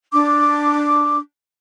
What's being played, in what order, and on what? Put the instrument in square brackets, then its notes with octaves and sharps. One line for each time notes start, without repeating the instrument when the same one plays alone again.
[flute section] D4 D6